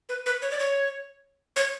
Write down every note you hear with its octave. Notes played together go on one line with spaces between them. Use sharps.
B4
B4
C#5
D5
C#5
C#5